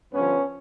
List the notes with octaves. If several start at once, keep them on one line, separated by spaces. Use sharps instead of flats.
G2 D3 F3 B3 C#4